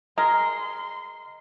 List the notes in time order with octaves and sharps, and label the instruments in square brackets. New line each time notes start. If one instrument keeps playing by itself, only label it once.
[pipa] G#3 A#4 [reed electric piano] D#5 F6 [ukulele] A#5 [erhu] C6